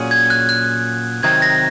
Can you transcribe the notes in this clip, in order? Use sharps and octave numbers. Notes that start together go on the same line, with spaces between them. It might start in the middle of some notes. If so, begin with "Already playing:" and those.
Already playing: A#2 F#3 C#4 G#4
G#6
F#6
F#6
C3 D#3 F#3 C4 D#4 G#6
A#6